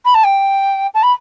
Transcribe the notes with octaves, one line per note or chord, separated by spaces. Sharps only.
B5
A5
G5
A5
B5